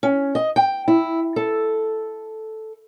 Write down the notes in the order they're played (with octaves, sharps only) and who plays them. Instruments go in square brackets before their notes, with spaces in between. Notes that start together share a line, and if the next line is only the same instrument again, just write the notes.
[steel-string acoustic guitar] C#4
D#5
G5
E4
A4